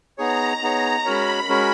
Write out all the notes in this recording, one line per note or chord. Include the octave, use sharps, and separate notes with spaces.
B3 D#4 G#4 C#5 A#5
B3 D#4 G#4 C#5
G#3 C#4 F#4 A#4 C#5 B5
G#3 C#4 F#4 A#4 C#5